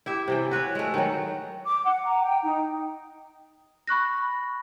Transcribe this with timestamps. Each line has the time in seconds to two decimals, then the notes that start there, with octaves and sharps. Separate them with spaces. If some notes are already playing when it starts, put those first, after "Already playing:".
0.06 E4 G4 E5
0.28 C3 E3 G5
0.51 F#4 B4 C#5 E5
0.75 G#3 A3
0.94 D#3 F#3
1.66 D6
1.85 F#5
2.05 A#5
2.21 G5
2.44 D#4
3.87 B5 C#6 F#6 A#6